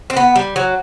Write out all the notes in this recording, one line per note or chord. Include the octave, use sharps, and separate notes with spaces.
C4
B3
G3
F#3